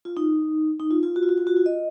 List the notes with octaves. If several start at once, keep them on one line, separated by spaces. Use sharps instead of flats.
F4
D#4
D#4
F4
F4
F#4
F4
F#4
F4
F#4
F4
D#5